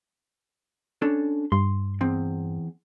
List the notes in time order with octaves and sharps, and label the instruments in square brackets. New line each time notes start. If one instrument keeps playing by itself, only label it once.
[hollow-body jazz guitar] C#4 D4 A4
[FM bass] G2 [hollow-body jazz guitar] C6
[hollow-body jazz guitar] E2 C4